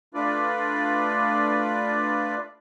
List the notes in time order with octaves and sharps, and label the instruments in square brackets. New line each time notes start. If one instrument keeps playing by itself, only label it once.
[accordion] A3 D4 F4 B4 D5